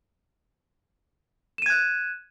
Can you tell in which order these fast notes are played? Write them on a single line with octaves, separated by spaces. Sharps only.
E7 D#7 G#6 F#6